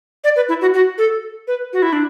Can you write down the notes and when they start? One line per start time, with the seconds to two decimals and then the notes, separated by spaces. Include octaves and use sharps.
0.24 D5
0.36 B4
0.49 E4
0.61 F#4
0.74 F#4
0.98 A4
1.48 B4
1.73 F#4
1.82 E4
1.93 D4